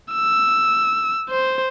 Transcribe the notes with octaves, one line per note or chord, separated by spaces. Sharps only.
E6
C5